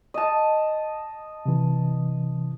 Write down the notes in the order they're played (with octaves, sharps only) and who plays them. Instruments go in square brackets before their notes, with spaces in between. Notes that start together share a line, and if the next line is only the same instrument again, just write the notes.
[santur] D#5 A5
[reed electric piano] C3 E3